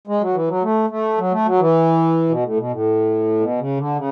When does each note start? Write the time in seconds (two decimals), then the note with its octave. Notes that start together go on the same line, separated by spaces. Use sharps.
0.07 G#3
0.21 F#3
0.34 E3
0.48 F#3
0.63 A3
0.90 A3
1.18 F#3
1.32 A3
1.46 F#3
1.60 E3
2.29 B2
2.44 A2
2.57 B2
2.71 A2
3.40 B2
3.59 C#3
3.78 D3
3.96 C#3